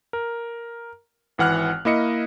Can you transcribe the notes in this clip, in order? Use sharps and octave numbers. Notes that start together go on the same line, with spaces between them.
A#4
G#1 E3 F#5 F6 F#6
A#3 E4 D#5 C#7